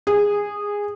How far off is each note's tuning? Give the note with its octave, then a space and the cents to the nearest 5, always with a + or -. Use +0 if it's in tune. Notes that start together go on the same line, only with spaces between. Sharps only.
G#4 -15